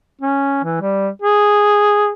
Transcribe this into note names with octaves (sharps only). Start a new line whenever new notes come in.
C#4
E3
G3
G#4